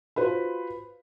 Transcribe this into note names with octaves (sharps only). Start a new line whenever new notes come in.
F4 F#4 B4 C5 B5